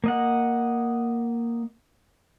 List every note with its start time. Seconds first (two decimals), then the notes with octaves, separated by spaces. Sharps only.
0.04 A#3 D#5 F#5